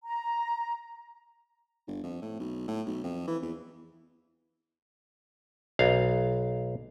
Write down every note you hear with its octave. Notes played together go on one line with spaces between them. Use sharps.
A#5
G1
F2
A2
B1
A2
B1
F2
E3
E2
B1 F5